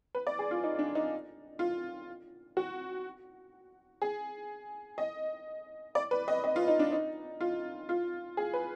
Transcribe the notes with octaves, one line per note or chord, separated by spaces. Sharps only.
B4
D5
G#4
F4
D#4
D4
D#4
F4
F#4
G#4
D#5
D5
B4
D#5
D#5
F4
D#4
D4
D#4
F4
F4
G#4
B4